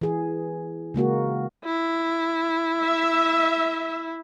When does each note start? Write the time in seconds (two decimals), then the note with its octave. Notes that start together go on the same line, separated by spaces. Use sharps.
0.01 E3 G#4
0.94 C#3 G#3 A#3 F#4
1.65 E4
2.82 E5